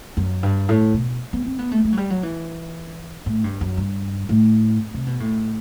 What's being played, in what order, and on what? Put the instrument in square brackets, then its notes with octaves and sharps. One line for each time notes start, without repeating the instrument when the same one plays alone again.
[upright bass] F#2
G2
A2
B2
B3
C4
B3
A3
A3
F#3
G3
F#3
E3
A2
G2
F#2
G2
A2
C3
B2
A2